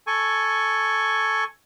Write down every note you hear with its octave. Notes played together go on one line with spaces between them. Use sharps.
A4 G#5 C#6